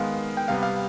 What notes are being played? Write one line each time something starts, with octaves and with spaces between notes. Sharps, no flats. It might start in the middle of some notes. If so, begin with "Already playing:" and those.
Already playing: D#3 G#3 B3 F5
G5
C3 G3 B3 F5
F5